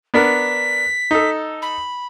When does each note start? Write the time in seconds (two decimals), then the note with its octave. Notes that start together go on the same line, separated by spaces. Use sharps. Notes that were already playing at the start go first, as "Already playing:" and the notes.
0.14 B3 D4 A#4 B6
1.11 D#4 A4
1.62 B5